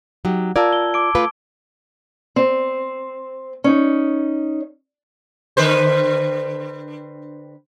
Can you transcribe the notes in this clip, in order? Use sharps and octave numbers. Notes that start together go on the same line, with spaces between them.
F#3 D#4 G4
F4 A#4 D5 A5 E6 G#6
G7
D6 D7
A3 F4 B4
C4
C#4 D#4
D3 B4 C5